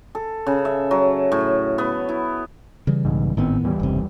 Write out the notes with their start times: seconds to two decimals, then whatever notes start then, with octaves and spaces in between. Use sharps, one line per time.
0.15 A4
0.47 C#3
0.65 E5
0.91 F#3
1.32 A2
1.78 B3
2.09 E4
2.87 C#3 E3 G3
3.05 B1 G#2
3.37 G#1 A2 D#3 B3 C4
3.63 D#2 E3 G3
3.80 F#1 C3